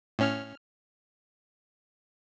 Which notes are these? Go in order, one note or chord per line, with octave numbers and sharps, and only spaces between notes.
A2 C#4 F6